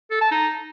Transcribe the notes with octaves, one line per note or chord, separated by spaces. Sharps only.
A4
A5
D#4